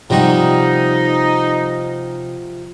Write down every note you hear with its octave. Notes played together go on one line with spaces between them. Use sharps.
C3 F3 G3 D#4 F#4 G4